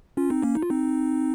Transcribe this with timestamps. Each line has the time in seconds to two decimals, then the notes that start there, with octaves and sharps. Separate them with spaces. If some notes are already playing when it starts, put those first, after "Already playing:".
0.17 C#4 F4
0.30 C4 D#4
0.42 A#3 C#4
0.55 D#4
0.63 F4
0.70 C4 D#4